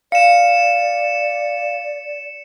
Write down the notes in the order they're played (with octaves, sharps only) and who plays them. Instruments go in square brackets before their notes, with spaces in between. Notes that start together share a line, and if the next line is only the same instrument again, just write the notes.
[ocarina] D5 [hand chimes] F5 [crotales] C#7 E7